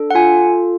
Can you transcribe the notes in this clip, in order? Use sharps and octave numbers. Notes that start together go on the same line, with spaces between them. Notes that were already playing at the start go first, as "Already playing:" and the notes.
Already playing: D4 A4
F#5
F4 G#5